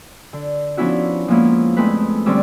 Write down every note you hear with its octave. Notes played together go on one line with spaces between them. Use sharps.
D3
F3 B3 C#4 D4 E4 F#4
F3 G#3 A#3 B3 C#4 E4
F2 G#3 A3 C4 B4
D3 G3 C4 C#4 D6 E6